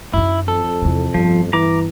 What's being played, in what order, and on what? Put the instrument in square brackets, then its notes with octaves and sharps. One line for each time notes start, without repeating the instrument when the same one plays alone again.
[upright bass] F#2 D#3 [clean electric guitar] E4
[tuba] F2 [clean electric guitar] A4
[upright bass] E2 C3
[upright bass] G1 [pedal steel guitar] F3
[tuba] E3 [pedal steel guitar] A#5 D6